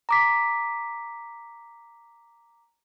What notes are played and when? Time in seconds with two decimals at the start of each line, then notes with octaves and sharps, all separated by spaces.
0.09 A#5 D6 B6